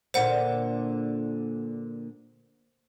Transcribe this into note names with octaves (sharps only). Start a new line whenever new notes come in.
A#2 D3 A#3 C5 F#5